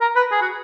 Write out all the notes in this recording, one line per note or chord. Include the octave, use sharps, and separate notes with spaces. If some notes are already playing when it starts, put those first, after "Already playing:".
A#4
B4
G#4
F#4